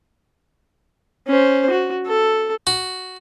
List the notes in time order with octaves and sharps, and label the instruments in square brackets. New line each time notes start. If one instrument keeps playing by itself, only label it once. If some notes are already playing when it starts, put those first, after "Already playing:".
[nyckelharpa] C#4 C5
F#4
A4
[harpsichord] F#4